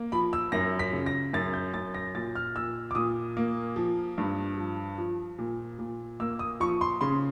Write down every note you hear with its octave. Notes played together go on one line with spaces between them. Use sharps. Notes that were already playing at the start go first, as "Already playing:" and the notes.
Already playing: A#3
F3 B5
E6
F#2 A#6
B6
C#3
A#6
F#2 A6
G6
F#2 A6
A#6
A#2 A6
F6
A#2 E6
D6
A#2 D#6
A#3
F3
G2
F3
F3
A#2
A#2
A#3 E6
D#6
F3 C#6
C6
C#3 C6